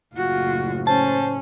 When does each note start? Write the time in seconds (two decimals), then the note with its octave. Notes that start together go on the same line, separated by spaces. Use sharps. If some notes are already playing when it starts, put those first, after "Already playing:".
0.14 F#1 A2 F4 F#4
0.87 C#4 C5 A5